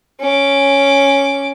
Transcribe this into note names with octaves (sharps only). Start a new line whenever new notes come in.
C#4 D6